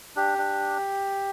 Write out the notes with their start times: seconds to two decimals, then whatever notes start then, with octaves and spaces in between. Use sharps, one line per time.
0.16 D4 G4
0.38 D4